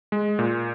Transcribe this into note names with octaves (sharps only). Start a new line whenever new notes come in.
G#3
A#2